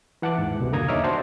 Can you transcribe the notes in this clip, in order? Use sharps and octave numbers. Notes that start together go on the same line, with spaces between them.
E3 F#5 A5 D6 F#6
D#2 G#2
C2 B2
F2 D3 A#3 A#5 D#6 G#6
D#2 D#4 C#5 E5 D6 F6
D4 F#4 C5 A5 A#5